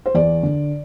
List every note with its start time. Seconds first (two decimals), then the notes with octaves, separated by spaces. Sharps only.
0.06 C5
0.14 E2 D5
0.43 D3